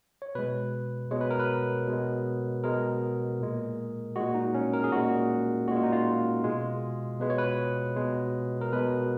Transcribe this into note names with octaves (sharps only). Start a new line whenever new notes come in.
C#5
B2 G#3 B4
B2 G#3 C#5
B4
A#4
B4
B2 G#3
B2 G#3 A#4
A#2 G#3
A#2 G#3 F#4
D#4
C#4
A#4
G#4
A#2 G#3 F#4
A#2 G#3 F4 F#4
D#4
F4
B2 G#3
B2 G#3 B4
C#5
B4
B2 G#3
A#4
B2 G#3 B4